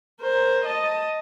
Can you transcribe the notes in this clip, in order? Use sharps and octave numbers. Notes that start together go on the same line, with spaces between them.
A#4 C5
D#5 A5